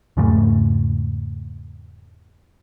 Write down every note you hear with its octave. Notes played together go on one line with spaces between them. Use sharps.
E2 G#2 C#3 A3